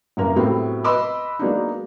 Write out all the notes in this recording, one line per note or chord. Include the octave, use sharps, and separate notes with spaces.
F#1 C2 A#3 A#4
A2 C3 F#3 A3 B3 C4
B4 D#5 B5 C6 D6 E6
F#3 G#3 A#3 B3 D4 D#4